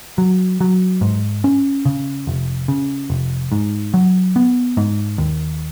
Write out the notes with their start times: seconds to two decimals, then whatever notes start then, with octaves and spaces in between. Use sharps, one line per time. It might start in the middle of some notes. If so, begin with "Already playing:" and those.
0.18 F#3
0.61 F#3
1.01 G#2
1.44 C#4
1.86 C#3
2.27 F1
2.68 C#3
3.10 F1
3.52 G#2
3.94 F#3
4.36 B3
4.77 G#2
5.18 D#2